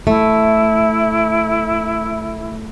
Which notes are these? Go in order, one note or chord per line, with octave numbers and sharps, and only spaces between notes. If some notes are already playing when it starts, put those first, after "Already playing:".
A3 E4